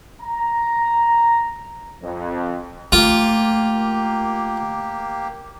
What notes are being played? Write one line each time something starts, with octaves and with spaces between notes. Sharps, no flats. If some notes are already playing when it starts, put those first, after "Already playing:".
A#5
F2
A3 A#3 F4 G4